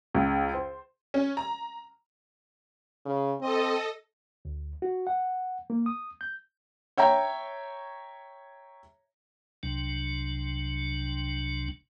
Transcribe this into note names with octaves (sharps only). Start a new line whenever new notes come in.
C#2
C5
C#4
A#5
C#3
C4 A4 D#5
D2
F#4
F#5
A#3
D#6
G6
C#5 E5 G5 A#5
C2 C3 F#3 D4